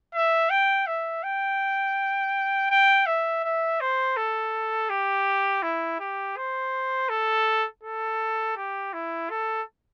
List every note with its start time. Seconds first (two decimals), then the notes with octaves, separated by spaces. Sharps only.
0.14 E5
0.50 G5
0.87 E5
1.23 G5
2.70 G5
3.06 E5
3.44 E5
3.81 C5
4.17 A4
4.90 G4
5.63 E4
6.00 G4
6.37 C5
7.09 A4
7.83 A4
8.57 G4
8.93 E4
9.30 A4